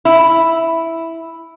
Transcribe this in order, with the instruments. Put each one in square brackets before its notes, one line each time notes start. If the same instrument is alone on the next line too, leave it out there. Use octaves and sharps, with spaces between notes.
[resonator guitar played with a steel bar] E4